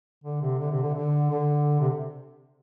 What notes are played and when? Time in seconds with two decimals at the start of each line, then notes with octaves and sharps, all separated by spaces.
0.24 D3
0.42 C3
0.59 D3
0.71 C3
0.82 D3
0.94 D3
1.30 D3
1.81 C3